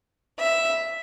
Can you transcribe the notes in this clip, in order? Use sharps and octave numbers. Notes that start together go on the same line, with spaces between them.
E5